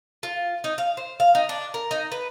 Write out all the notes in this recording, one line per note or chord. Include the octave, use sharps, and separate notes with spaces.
F4
D#4
F5
C5
F5
D#4
D4
A#4
D#4
B4